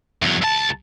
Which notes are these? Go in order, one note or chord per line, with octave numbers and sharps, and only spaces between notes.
E2 F#3
C#2 A5